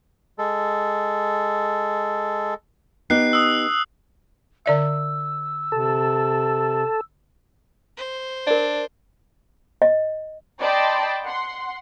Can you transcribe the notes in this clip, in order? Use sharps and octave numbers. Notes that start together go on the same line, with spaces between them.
G#3 A4
B3 D#4 G4 F#6 C7
D#6 E6
D3 D5 E5 E6
C3 A4
C5
D4 A#4 D5
D#5
D5 D#5 G5 A5 B5 C6
F#5 C6